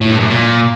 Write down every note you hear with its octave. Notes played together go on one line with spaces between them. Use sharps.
A2
G2
F#2
A#2